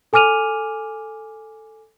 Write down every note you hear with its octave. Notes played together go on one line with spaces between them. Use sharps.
A4 G#5 D6 F6 D#7 F7